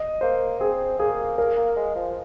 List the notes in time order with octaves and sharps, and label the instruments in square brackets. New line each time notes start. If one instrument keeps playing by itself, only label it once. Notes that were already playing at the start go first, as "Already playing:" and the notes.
Already playing: [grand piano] D#5
[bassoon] A#3 [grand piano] C5
[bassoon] C4 [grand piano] G#4
[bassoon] A#3 [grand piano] G#4
[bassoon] A#3 [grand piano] A#4
[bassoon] A#3
G#3
F3